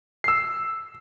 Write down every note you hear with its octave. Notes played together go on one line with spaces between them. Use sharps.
E6 C7